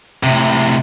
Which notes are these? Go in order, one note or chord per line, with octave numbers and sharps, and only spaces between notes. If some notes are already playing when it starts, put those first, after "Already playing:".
A2 C3